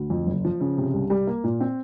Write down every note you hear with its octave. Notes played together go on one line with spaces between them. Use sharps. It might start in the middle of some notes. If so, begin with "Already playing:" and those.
Already playing: D2
F2
F#1
F3
C#3
C3
C2
G3
A#3
A#2
C4